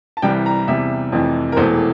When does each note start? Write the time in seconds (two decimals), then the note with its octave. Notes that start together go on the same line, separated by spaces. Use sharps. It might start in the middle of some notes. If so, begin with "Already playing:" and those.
0.17 A5
0.22 C2 C3 E3 G3 G5
0.46 A#5
0.68 E2 C3 G3 E5
1.12 F1 F2 C3 E3
1.52 A#4
1.56 E1 E2 E3 A3 C5